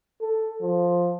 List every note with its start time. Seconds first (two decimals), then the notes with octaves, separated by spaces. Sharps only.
0.21 A4
0.62 F3